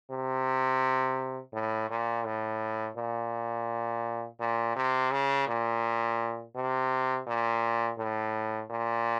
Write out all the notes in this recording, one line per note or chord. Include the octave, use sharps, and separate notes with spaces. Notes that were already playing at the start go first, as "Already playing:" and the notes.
C3
A2
A#2
A2
A#2
A#2
C3
C#3
A#2
C3
A#2
A2
A#2